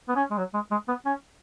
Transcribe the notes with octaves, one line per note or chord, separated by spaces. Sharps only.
B3
C#4
G#3
F#3
G#3
G#3
B3
C#4